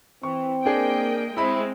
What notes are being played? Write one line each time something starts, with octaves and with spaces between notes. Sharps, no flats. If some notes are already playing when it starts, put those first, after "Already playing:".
E3 C4 C#6
A#3 D4 G#4 D#5 G5
G#3 C4 E4 E5 B5